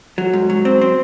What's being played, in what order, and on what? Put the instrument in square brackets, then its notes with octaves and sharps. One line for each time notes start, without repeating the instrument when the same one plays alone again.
[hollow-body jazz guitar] F#3
G#2
F#3
C4
C4